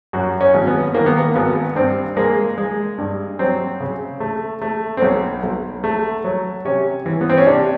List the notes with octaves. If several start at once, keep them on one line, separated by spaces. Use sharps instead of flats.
F#2 F#4
C#4
G#1
B3
D#3 A#3
B3
A#3
G#1 B3
G2 C4
G#3 A#3
G#3
G2
F#3 C4
C#3
A3
A3
C4
B1 C#4
B1
A3
F#3
C3 C#4
E3
B3
C4
C#4
C3 D4